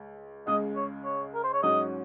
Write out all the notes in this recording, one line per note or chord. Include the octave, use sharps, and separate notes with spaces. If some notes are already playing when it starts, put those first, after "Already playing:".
Already playing: C#2
C#2 C#3 G#3 D#5
C#5
C#5
A#4
C5
C#5
G#2 F#3 C#4 D#5